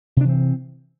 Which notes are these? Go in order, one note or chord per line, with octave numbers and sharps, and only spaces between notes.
C3 E3 C4 D4